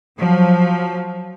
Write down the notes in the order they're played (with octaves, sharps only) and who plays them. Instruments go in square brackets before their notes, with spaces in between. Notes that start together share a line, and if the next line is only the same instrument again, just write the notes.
[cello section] F3 F#3